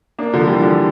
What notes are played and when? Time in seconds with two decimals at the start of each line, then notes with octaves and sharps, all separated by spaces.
0.19 A#3 D4
0.33 D3 F3
0.47 E3 G3
0.62 D3 F3